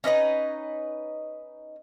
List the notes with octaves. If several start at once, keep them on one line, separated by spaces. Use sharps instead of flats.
C#4 D#4 B4 D#5